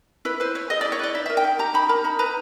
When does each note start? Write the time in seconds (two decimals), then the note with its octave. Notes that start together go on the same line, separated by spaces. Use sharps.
0.25 E4 B4
0.40 B4 C5
0.55 E4 C#5
0.70 G#4 D#5
0.81 D5
0.85 E4
0.92 C#5
0.99 B4 D5
1.14 D#4 E5
1.26 E5
1.30 A#4
1.37 G5
1.44 D#4
1.59 G4 A#5
1.74 D#4 B5
1.89 A#4 A#5
2.04 D#4 B5
2.19 B4 A#5